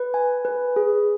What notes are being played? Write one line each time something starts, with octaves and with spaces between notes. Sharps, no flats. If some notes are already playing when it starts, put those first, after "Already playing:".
Already playing: B4
G#5
B4
G#4